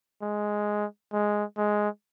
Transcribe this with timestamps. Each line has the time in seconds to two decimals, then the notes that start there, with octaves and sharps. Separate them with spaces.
0.22 G#3
1.13 G#3
1.57 G#3